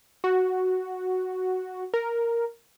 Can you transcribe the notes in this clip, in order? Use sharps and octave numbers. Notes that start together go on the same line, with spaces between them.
F#4
A#4